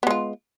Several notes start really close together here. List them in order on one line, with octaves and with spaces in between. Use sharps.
B3 G#3 F4